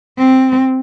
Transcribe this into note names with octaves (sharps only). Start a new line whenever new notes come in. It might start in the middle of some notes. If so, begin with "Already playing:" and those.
C4